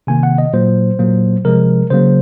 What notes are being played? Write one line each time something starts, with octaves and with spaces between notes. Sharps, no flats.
C3 D#3 A#3 G#5
F#5
D#5
A#2 F#3 A#3 C5
A#2 F#3 A#3
C3 F3 G#3 A#4
C#3 F#3 A#3 C5